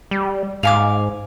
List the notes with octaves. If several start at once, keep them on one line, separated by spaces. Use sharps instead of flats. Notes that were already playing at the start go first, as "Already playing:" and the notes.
G3
G#2 F5 G#5 D6